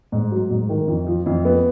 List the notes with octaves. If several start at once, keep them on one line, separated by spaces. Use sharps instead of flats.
G#2
F#3
G#2
D#3
F2
F3
F2
B3